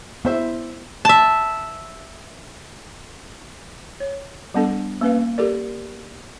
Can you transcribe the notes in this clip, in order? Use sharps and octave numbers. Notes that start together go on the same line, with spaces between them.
B3 E4 C5 E5
E5 A5
C#5
G3 B3 D4 A4
A#3 C#4 B4 F5
G4 A4 A#4 D5